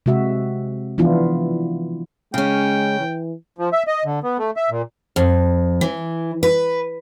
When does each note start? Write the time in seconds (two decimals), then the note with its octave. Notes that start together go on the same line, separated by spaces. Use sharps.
0.06 C3 G#3 F#4 E5
0.98 E3 F3 B3 D4 E4 F4
2.34 C#3 G#3 C#4 G5
3.00 E3
3.58 F3
3.73 E5
3.87 D#5
4.05 D3
4.23 B3
4.38 A3
4.57 E5
4.70 A#2
5.16 F2
5.81 E3
6.43 B4